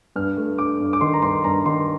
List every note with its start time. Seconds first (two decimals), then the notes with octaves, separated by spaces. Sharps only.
0.16 G2 F6
0.37 A3
0.58 D4 D6
0.80 G2
0.93 D6
1.01 D#3 C6
1.13 A#5
1.22 G2 C6
1.44 G2 A#5
1.66 D#3 C6